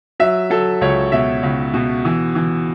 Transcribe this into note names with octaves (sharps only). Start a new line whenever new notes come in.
F#3 E5
F#3 A4
C#2 C#5
B2 E5
C#2
B2
E3
E3